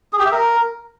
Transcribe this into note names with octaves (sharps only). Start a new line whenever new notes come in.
G#4
G4
E5
A#4